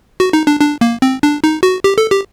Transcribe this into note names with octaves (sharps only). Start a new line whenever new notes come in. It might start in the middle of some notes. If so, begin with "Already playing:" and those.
F#4
D#4
D4
D4
A#3
C4
D4
D#4
F#4
G4
A4
G4